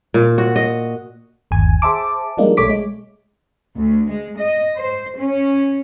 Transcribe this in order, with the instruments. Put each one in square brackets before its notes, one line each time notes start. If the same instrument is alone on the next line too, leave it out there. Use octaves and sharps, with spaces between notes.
[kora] A#2
F#4
D#5
[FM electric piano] G1 D#2 G#5
G#4 C5 E5 A5 D6
F3 G3 G#3 A#3 D4 D#4
B1 A3 C#5 D6 B6
G#3
[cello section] D2
G#3
D#5
C5
C#4